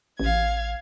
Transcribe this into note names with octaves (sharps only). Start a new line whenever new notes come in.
A1 F5 G#6